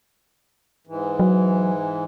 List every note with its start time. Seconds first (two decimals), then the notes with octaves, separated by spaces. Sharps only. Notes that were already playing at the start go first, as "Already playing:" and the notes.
0.87 G#2 E3
1.20 F#3